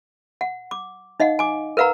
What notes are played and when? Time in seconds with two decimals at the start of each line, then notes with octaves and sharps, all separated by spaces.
0.41 F#5
0.71 D6
1.20 D#4 D#5 F5 F#5
1.39 G#5 D6
1.77 A#4 B4 F5 F#5 A#5